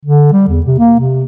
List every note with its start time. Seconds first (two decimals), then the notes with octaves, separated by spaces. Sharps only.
0.06 D3
0.33 G3
0.49 E2
0.66 C3
0.79 A#3
1.00 C3